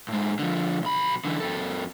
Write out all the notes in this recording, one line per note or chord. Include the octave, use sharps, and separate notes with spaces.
A2 G#3
D3 F3
B1 B5
D3 E3
F#2 A4